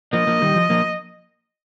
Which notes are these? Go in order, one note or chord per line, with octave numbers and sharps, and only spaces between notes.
F3 A#3 D#5
F3 A#3
D#3 G3
F3
F3 A#3